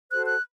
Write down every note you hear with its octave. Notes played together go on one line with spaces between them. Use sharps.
F#4 A4 C5 F#6
F#6